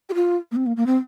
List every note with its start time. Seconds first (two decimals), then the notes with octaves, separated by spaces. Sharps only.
0.10 G4
0.15 F4
0.52 A#3
0.56 C4
0.66 A#3
0.77 A#3
0.86 C4